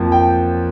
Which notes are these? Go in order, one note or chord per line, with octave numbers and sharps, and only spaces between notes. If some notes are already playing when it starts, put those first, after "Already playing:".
Already playing: F2 F3 A#3
G5